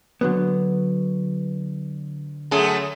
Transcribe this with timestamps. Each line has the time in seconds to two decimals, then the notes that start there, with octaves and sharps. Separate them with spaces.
0.21 D3 F#3 B3
2.51 F#2 A3 G#4